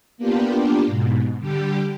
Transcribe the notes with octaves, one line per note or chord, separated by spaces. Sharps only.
A#3 B3 D4 F4 G4
G#2 B2
D3 G3 G4